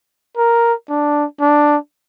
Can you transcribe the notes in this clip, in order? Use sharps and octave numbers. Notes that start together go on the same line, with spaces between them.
A#4
D4
D4